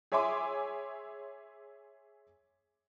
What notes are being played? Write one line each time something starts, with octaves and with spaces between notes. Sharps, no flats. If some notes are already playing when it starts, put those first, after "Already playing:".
G#4 C#5 E5 G#5 C6 D6